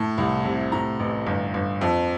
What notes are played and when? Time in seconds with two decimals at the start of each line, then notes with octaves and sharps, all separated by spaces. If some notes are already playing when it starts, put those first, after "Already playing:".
Already playing: A2 A5
0.18 C2
0.45 C3
0.72 A2 A#5
0.99 A1
1.27 G1
1.54 G1
1.81 F2